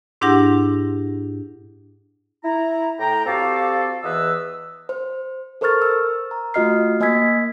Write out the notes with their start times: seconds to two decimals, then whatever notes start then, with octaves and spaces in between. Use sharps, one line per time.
0.21 G#2 D4 E4 G4 F#5 A#6
2.44 E4 A#5
2.99 A2 G5 A#5
3.26 C4 F#4 G4 A4 D5 F5
4.03 E2 E3 B4 D#5 E6
4.89 C5
5.61 A4 A#4 C5 C#6 F6 A6
5.82 E6
6.31 A#5
6.54 A3 F4 F#4 D#5 F6 C7
7.00 A#3 D#5 G#5 E6 G#6 B6